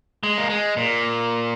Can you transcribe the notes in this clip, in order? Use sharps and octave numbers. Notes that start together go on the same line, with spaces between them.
G#3
A#3
G#3
A#2